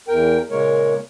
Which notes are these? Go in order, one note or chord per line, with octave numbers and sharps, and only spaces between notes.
E2 A#4 G5
A#2 C#3 G#3 A#3 A#4 C#5